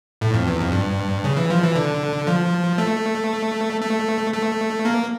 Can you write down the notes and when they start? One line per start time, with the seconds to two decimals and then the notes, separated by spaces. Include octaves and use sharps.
0.21 A2
0.34 F2
0.47 E2
0.60 F2
0.72 G2
1.24 C#3
1.37 E3
1.50 F3
1.63 E3
1.76 D3
2.27 F3
2.78 A3
3.81 A3
4.33 A3
4.85 A#3